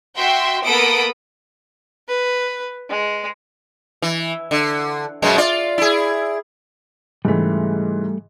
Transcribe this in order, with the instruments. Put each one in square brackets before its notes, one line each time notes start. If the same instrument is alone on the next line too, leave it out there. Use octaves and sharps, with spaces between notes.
[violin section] F#4 E5 G5 C6
A#3 B3 A4 B5 D#6 D7
[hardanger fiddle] B4
G#3
[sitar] E3
D3
F#2 B2 G#3
F4 D5
E4 G#4
[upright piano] G#2 C#3 E3 [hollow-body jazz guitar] G3 A3